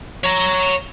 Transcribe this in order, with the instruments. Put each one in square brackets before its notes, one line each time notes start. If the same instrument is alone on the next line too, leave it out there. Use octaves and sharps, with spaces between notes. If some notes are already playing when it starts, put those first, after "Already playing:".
[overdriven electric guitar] C#5 A#5